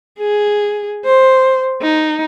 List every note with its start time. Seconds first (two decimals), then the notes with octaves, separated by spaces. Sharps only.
0.19 G#4
1.05 C5
1.82 D#4